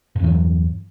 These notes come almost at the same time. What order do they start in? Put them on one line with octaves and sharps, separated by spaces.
G2 E2 E3 F#3